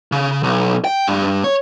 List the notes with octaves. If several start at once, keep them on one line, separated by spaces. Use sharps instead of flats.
C#3
B1
G5
G2
C#5